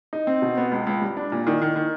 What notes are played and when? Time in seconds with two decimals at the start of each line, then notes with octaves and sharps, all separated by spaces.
0.13 D#4
0.27 C4
0.42 B2
0.57 B3
0.72 C#2
0.87 C#2
1.02 G3
1.17 D4
1.32 A#2
1.47 D#3
1.62 D#3
1.76 D#3